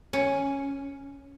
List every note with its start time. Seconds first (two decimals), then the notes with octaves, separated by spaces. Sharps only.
0.13 C#4